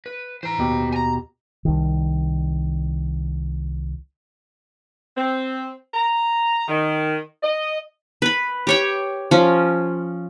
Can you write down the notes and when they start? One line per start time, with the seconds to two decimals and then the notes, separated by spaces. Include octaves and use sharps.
0.06 B4
0.43 E3 C5 A#5
0.58 D#2 B2 G4
0.92 G#5 A#5
1.65 C2 D#3
5.17 C4
5.94 A#5
6.68 D#3
7.43 D#5
8.22 B4 B5
8.67 G4 C#5 G5
9.31 F3 C#4